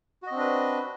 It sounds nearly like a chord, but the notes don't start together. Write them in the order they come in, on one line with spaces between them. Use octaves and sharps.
F#4 D#5 C4 D4 B4